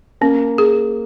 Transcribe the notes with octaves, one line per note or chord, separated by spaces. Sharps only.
A#3 C#4
G#4